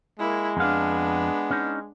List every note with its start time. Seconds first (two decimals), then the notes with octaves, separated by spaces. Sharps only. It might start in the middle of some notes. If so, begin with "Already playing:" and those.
0.19 G#3 A#3 E4
0.57 F2 B3 D4 F5
1.50 C#4 D#4